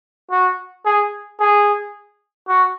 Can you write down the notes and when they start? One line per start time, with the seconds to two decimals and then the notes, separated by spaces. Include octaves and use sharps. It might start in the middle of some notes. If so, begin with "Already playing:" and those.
0.31 F#4
0.85 G#4
1.40 G#4
2.48 F#4